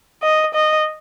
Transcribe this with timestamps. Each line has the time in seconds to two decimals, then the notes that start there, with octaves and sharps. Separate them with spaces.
0.23 D#5
0.54 D#5